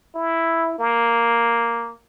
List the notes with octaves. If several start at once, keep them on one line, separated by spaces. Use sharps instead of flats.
E4
A#3